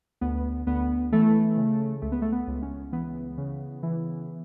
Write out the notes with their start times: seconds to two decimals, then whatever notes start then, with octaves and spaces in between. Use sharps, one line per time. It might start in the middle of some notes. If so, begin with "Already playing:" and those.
0.21 D2 B3
0.67 D2 B3
1.12 E3 A3
1.57 C#3
2.02 C#2 A3
2.12 B3
2.22 A3
2.32 B3
2.47 C#2
2.62 C#4
2.92 E3 B3
3.38 C#3
3.83 E3